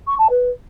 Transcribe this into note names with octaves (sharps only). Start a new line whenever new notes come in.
C#6
A5
B4